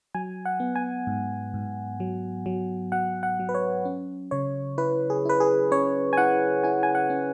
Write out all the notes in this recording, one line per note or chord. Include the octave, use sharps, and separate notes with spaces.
F#3 G#5
F#5
B3
G#5
G#2
G#2
F#3
F#3
F#3 F#5
F#5
F#3
B4
C#5
C#4
C#3 C#5
E4 B4
G#4
E4 B4
G#4
C#4 C#5
G#5
E4 F#5
E4 G#5
G#5
F#5
C#4